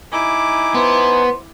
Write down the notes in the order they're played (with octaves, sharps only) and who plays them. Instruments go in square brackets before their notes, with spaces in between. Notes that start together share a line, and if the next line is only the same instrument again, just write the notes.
[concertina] D#4 G#5 [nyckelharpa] E4 D6
[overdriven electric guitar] B3 [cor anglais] C5